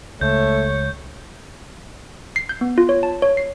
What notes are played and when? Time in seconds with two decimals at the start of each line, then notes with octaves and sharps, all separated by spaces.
0.21 C#2 A3 C#5 G6
2.36 C7
2.49 G6
2.61 B3
2.78 F4
2.89 C#5
3.03 A5
3.22 C#5
3.37 C7